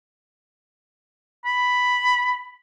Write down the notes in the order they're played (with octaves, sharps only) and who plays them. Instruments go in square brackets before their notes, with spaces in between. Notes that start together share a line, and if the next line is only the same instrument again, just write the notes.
[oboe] B5